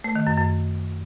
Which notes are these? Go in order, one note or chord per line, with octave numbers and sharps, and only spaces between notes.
A3
D#3
F#2
F#2